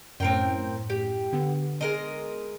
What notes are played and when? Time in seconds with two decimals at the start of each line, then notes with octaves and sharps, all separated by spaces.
0.20 F#2 A2 C4 A#4 G5
0.90 G4
1.33 D3 B3
1.81 G#3 A#4 D#5